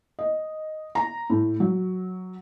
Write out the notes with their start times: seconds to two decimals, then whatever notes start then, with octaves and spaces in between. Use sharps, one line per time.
0.19 D#5
0.95 A#5
1.30 A2
1.60 F#3